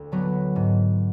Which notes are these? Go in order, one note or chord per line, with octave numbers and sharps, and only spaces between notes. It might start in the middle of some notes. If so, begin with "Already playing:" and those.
Already playing: D2
D3 F#3 B3
G#2